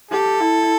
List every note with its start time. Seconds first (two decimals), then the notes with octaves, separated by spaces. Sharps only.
0.11 G4 A4
0.40 E4